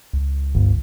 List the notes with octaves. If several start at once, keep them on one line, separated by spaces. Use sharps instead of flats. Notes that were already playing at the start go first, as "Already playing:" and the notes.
C#2
G1